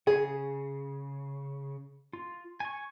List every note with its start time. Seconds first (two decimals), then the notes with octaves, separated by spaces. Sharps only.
0.07 C#3 G#4
2.13 F4
2.60 G#5 C#6